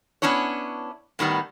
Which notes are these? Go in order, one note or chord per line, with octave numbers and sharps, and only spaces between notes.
B3 C#4 D4 E4 C#5
A2 D#3 G3 B3